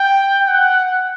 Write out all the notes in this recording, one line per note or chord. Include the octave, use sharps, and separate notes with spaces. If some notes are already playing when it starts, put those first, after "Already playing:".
Already playing: G5
F#5